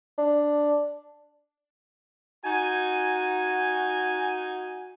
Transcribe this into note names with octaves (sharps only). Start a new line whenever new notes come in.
D4
D#4 F#4 G#5